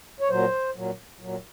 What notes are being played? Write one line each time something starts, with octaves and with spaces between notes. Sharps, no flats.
C#5
A#2 F#3 C5
A#2 F#3
A#2 F#3